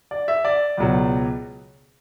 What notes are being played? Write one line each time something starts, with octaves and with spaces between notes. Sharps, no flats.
D5
E5
D5
C#2 B2 F#3